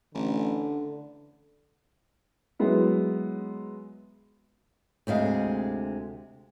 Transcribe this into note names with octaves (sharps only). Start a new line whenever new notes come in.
A1 D3
F#3 G#3 B3 E4
D2 C3 G#3 F5